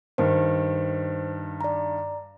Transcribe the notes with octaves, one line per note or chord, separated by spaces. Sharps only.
G2 D#3 C5
D5 A#5